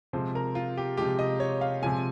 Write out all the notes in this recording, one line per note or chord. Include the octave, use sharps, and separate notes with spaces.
C3 F3 G#3 C5
A#4
F4
G4
C3 F3 G#3 G4
D#5
C#5
F5
C3 F3 G#3 G#5